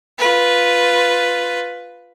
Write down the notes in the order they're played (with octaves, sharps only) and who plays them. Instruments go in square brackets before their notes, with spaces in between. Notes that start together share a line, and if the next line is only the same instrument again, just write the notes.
[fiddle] F4 B4